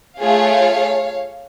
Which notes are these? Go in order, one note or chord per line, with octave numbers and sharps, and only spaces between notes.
A3 F4 G#4 C#5 F5